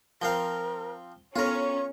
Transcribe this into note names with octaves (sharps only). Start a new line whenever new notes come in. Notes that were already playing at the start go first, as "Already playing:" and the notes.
F3 C4 A#4 F5 G7
B3 C#4 F4 A4 A#4 A#5 C#6